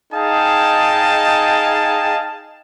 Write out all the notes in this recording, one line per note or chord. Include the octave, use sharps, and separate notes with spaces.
D#4 G#4 D#5 F5 G5 A5